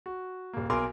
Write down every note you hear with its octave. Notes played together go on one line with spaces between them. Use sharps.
F#4
D#1 A#3
B1 A#4 G#5 C6 D6